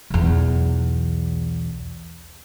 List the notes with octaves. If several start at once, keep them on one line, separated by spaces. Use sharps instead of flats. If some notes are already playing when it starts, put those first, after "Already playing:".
B1 E2